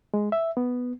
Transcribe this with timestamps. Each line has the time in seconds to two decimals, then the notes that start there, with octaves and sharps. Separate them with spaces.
0.14 G#3
0.32 E5
0.57 B3